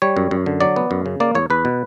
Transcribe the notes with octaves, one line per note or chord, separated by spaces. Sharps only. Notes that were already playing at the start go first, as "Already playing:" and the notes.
G3 C#5
F#2
F#2
D3
F#3 D5
B3
F#2
C#3
A#3 D5
E2 C#5
E2 B4
B2